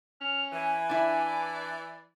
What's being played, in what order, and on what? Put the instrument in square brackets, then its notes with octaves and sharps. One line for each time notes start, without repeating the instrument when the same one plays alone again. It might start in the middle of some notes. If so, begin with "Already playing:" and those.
[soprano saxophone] C#4 [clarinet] F6
[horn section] E3 [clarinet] G#5
[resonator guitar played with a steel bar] D4 E4 [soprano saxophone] D5